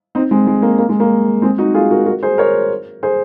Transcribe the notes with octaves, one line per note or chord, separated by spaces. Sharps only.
C4 D#4
G#3 C4
G#3
A#3
A#3
G#3
A#3
G#3 C4
D#4 F#4
F4 G#4
F#4 A#4
F#4 A#4
G#4 C5
A#4 C#5
G#4 C5